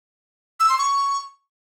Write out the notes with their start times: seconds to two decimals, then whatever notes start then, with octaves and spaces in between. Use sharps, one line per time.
0.60 E6
0.69 C6
0.78 C#6